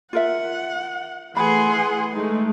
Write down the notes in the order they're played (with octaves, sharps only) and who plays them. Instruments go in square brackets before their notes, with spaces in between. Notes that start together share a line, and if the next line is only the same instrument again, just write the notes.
[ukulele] F4 A#4 E5 [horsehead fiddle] F#5
[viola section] E3 A3 C6 [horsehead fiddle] G#4 F#5 [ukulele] B5
[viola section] G#3 A3 [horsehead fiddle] D#4